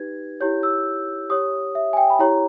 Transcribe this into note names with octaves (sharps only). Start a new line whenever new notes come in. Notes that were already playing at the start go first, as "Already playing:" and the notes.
Already playing: D#4 G4 B4 G#6
E4 G4 C#5 G6
E6
G4 C#5 D#6
E5
G#5
G5
B5
E4 G4 C#5 A#5